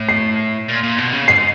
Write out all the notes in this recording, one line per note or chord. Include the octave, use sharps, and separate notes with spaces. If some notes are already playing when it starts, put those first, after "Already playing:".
Already playing: A2
C7
A#2
A#2
B2
C#3
G#2 C7